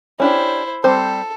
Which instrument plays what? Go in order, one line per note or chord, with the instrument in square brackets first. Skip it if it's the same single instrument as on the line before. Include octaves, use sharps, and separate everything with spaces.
[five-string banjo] C#4 D4 G4 [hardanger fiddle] E4 C5
[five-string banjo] G3 C4 C5 [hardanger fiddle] A4